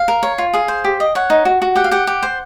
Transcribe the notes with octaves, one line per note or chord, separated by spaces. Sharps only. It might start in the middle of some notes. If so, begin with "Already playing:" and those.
Already playing: F5
A#4
C#5
F4
G#4 F5
C5
G4
D#5
C#5 F#5
D#4
F#4
F#4
G4 F#5
F5
G4 F#5
G4
C5